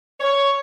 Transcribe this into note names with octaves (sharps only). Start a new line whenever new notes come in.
C#5